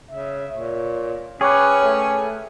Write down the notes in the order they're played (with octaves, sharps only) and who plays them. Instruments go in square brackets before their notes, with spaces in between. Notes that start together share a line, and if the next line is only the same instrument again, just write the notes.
[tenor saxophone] C#3 [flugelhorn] E5
[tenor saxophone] A#2 [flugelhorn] C#5
[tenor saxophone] C#4 [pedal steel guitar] G#4 B4 [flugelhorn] C#5 [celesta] G5 C#6 D6
[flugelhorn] A3